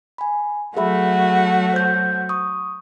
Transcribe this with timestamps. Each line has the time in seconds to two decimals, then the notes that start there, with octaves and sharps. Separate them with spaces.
0.18 G#5 B5
0.77 F#3 A3 F#4 G#4 E5 B5
1.74 C5 G6
2.29 C#6 D#6